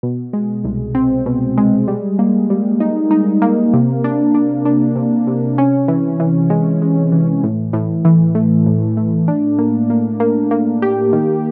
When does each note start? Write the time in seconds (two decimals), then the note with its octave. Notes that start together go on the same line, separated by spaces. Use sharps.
0.03 B2
0.33 G#3
0.64 C2
0.95 C4
1.26 B2
1.58 G#3
1.88 G3
2.19 A#3
2.50 G3
2.80 D#4
3.11 D#4
3.42 A#3
3.73 C3
4.04 D4
4.35 D4
4.65 D4
4.96 C3
5.27 C3
5.58 C#4
5.88 E3
6.20 E3
6.50 G#3
6.82 G#3
7.12 E3
7.43 A2
7.73 A2
8.05 E3
8.35 A3
8.66 A2
8.97 A3
9.28 D4
9.59 A#3
9.90 A#3
10.20 A#3
10.51 A#3
10.82 G4
11.13 D#3